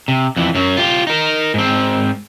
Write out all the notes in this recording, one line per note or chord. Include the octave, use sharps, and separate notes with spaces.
C3
F2 E3
F#2 F#3
F4 G4
D#4 A#4
G#2 C4